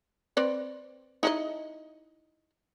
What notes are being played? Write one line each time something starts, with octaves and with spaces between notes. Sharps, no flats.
C4 B4 D5
D#4 E4 D#5